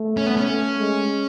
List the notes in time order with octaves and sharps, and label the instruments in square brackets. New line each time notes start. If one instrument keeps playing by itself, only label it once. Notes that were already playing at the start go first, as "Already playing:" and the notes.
Already playing: [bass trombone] A3
[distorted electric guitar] C#4
B3
C#4
[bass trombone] A3
G#3